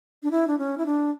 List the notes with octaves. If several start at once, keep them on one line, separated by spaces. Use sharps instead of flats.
D4
E4
D4
C#4
E4
D4